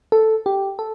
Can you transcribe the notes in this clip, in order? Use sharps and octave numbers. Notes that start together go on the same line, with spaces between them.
A4
G4
A4